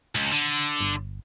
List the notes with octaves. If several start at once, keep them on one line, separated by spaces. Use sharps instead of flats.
C#2
D3
G1